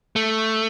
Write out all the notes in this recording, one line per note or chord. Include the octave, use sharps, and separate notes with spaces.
A3